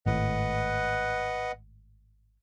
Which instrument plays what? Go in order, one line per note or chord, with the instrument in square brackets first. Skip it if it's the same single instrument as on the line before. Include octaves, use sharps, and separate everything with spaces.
[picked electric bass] G#1 A2 [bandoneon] B4 D#5 F#5